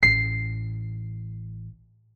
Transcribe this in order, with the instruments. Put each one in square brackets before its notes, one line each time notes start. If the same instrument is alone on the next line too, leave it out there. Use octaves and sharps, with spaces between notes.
[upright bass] A1 [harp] C7